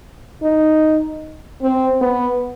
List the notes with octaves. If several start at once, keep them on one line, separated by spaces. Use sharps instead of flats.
D#4
C4
B3